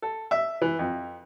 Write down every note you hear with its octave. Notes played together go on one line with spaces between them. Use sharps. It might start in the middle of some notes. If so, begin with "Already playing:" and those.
A4
E5
E3
F2